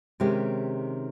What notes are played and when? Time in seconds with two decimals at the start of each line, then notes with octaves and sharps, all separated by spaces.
0.20 C3 D#3 G#3 C#4 G4